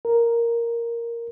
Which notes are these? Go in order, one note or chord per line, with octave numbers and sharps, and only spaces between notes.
A#4